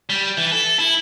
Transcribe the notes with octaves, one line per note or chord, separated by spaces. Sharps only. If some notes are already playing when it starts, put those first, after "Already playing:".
G3
E3
A4
E4